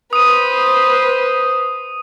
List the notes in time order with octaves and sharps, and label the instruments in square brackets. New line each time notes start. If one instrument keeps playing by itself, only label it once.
[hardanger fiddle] B4 C5 [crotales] D#6 D#7